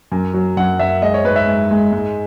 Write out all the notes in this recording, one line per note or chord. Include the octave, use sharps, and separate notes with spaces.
F#2
F#3
F#2 F#5
F#2 E5
G#3 D#5
C#5
G#2 B4
E5
G#2
G#3
G#2